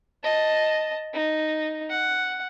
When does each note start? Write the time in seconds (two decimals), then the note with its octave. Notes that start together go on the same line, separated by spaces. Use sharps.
0.24 D#5 A5
1.13 D#4
1.90 F#5